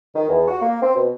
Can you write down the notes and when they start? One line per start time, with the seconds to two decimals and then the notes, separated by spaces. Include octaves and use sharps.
0.15 D#3
0.29 E2
0.48 F#4
0.62 A#3
0.82 C4
0.96 B2